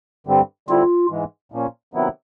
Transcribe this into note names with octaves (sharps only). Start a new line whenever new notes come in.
G2 D3 G3 C4
D3 G3 C4 E4 F4
G#2 E3 G#3
A#2 F3 A#3 C#4
C3 D#3 F#3 B3 E4